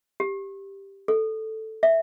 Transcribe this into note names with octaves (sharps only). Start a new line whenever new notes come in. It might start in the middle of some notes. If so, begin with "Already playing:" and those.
G4
A4
E5